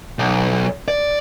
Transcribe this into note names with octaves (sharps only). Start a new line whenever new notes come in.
B1
D5